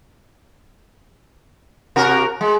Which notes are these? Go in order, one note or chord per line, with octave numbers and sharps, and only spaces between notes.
C3 F#4 A#4
G#3